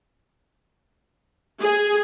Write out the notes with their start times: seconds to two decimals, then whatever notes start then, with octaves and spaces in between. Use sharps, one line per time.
1.62 G#4